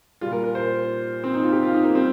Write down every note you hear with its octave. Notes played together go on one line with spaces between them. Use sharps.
A#2 G3 F4
A#4
A#4
C5
C4
D#4
F4
G4
F4
D#4
A#3
G3 C4